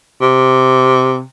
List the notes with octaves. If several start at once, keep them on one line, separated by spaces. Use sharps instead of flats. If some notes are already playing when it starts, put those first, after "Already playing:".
C3